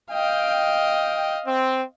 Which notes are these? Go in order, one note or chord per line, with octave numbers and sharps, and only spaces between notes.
D#5 F5 G5
C4